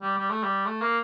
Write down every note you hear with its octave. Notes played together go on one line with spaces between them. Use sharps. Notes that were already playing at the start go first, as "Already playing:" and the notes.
G3
G3
A3
G3
A3
A#3